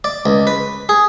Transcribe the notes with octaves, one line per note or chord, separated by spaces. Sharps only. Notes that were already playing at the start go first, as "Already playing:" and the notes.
D5
C#2
B4
G#4